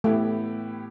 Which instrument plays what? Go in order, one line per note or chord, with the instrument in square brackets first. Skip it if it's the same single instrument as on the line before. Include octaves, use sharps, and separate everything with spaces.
[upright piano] A2 E3 B3 E4 G4 [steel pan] A3